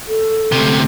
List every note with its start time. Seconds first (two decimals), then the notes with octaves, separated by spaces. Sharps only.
0.08 A4
0.52 D2 C3